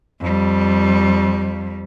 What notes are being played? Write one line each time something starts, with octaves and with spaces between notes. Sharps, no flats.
F2 G3